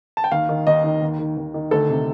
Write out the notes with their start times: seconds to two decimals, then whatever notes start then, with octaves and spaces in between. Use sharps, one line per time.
0.17 A5
0.24 G5
0.31 D#2 F5
0.49 D#3
0.67 D#2 D#5
0.84 D#3
1.02 D#2
1.19 D#3
1.37 D#2
1.54 D#3
1.71 D2 A4
1.89 C3